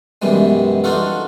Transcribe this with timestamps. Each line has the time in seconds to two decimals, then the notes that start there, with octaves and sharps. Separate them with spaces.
0.22 F#2 B2 E3 G3 G#3
0.84 D4 D#4 F4 F#4 A4